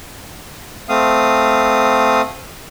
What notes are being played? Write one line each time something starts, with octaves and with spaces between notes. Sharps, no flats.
A3 C4 F5 D#6